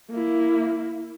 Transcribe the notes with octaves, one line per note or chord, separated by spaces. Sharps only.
A#3 E4